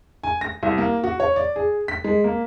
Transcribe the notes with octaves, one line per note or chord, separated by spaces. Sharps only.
G#5
A#6
C2
A#3
F#4
C#5
D5
G#4
B6
G#3
A#3